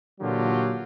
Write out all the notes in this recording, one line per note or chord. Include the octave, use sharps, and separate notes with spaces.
A#2 D3 E3 F#3 F4 G4